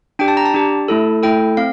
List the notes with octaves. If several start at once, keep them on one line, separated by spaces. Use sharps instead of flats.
D4 G4 G5
A5
A#5
A5
D4 G4
A3 E4 A4
A3 E4 A4 G5
C4 F5